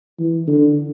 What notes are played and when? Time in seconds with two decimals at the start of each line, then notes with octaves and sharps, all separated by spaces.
0.19 E3
0.47 D3